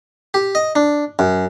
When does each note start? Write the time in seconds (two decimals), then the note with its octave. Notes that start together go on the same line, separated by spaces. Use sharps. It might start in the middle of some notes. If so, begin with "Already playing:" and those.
0.34 G4
0.55 D#5
0.76 D4
1.19 F#2